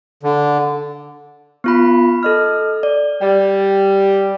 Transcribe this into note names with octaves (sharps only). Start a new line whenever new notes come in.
D3
B3 F4 B5
A4 D#5 F6
D5
G3